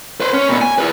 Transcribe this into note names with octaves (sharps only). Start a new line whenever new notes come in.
B4 C5
C#4
A#2 B3
G#5
G#4 B4